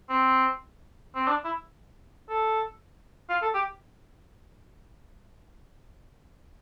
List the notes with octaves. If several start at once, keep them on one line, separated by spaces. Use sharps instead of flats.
C4
C4
D4
E4
A4
F4
A4
G4